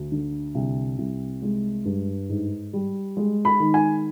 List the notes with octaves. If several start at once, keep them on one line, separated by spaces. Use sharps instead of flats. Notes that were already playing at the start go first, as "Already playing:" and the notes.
Already playing: D2
D3
C2
C2
G#3
G2
G#2
G3
G#3
B5
D#3
G#5